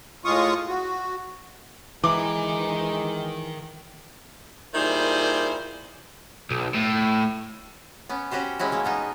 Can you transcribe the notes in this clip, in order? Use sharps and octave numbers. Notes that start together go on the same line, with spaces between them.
A2 G#3 F4 C#6 D#6
F#4
D#3 E3 G#3 A#4 D6
A#2 D#3 G3 E4 G#4 C5
B1
A2
B3 C#4
C#4 F#4 G4 C5
E3 F#3 G#3 C#4 E4 F#4
E3 G#3 A#3
B2 B3 D#4